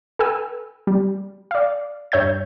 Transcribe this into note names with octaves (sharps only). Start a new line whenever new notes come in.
A4 B4 G5 G#5 E6
G3
D5 F5
G2 C#5 E5 G6 G#6